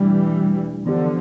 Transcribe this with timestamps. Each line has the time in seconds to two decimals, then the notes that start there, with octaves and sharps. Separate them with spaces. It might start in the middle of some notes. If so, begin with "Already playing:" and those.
Already playing: E2 B2 E3 G3 A3 D4
0.86 D3 E3 F3 B3 D4 G4